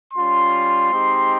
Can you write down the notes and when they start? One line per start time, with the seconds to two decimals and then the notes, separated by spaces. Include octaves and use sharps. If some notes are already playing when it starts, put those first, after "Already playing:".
0.14 G3 C#4 F4 C6
0.90 G#3 C4 D#4 G4